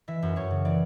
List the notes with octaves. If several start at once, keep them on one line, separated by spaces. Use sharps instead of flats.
E3 E5
F#2
F#2 C#5
C#3
E3 D5